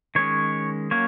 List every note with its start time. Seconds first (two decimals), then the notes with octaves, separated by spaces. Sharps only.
0.15 D#3 G#3 C#4 C#5
0.91 F#3 A#3 C#4 C#5